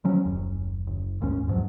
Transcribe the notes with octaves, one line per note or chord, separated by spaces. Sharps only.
C#3 F3 F#3 C#4
F#1 D#2
F#1
A1 D#2 G#2 C#4
E2 G#2 F3 F#3